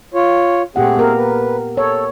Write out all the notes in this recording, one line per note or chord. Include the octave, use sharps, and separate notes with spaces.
F4 C#5
A#2 A3 C4 G4 G#4 F#5
A#3 B3 A#4
B4
A4 C#5